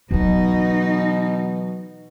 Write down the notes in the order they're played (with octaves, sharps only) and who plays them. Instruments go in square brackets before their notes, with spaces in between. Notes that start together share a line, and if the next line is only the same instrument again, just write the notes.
[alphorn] B2 [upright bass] E3 F#3 [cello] D#4